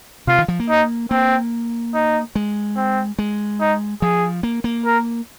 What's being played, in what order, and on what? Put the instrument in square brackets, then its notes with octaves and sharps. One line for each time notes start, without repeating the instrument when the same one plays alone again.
[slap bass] C3 [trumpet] F4
[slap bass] D#3
F3
A#3
[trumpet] D#4
[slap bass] A#3 [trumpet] C4
[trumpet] D#4
[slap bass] G#3
[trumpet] C4
[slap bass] G#3
[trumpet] D#4
[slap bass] F3 [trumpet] G#4
[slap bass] A#3
A#3
[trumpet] A#4